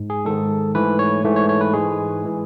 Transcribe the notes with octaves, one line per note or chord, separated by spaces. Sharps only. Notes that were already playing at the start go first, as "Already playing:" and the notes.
Already playing: G#2
G#4
G#2 D#3 G#3 A4
G#2 E3 A3 B4
C#5
G#2 E3 A3
C#5
C#5
B4
G#2 E3 G#3 G#4
E3 G#3